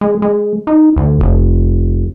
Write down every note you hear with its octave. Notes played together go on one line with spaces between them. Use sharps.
G#3
G#3
D#4
D2
F1